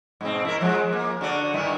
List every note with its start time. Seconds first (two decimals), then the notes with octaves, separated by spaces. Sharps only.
0.21 G#2 B2 C4
0.45 E4 A#4
0.61 F3 G#3
0.93 A#3
1.21 D3 F#4 D5
1.53 G2 D#3 E4